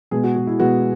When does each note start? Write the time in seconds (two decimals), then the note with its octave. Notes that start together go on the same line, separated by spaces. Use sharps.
0.11 B2 G#3 B3 G#4
0.24 F#4
0.36 F#4
0.47 E4
0.59 B2 G#3 B3 F#4